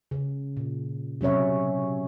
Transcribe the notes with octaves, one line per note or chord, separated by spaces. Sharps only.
C#3
A#2
C3 F#3 C#4 C#5 E5